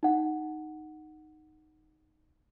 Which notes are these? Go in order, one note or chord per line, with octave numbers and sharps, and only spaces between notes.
D#4 F#5